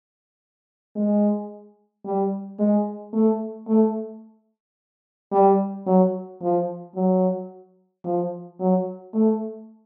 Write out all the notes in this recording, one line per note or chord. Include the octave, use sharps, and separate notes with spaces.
G#3
G3
G#3
A3
A3
G3
F#3
F3
F#3
F3
F#3
A3